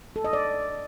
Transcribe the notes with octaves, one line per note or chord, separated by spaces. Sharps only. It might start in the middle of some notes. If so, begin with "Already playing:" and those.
A4
D#5
D5